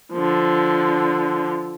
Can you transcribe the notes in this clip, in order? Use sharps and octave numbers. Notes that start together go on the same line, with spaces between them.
D3 F3